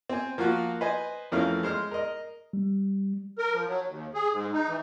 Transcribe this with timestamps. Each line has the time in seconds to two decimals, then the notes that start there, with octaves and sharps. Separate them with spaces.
0.09 C4 G#5
0.38 F3 A#3 F4 F#4
0.81 B4 C5 D#5 G#5
1.32 F2 E3 A3 C#4 A#4 F5
1.63 G#3 C5 F6
1.91 A#4 D#5
2.53 G3
3.38 A#4
3.53 F3
3.67 F#3
3.88 D#2
4.14 G#4
4.33 G#2
4.53 D#4
4.68 E3